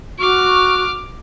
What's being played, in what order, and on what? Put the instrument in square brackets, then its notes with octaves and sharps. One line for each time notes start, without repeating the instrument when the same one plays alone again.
[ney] F#4 [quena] C#6 [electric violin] D6 F6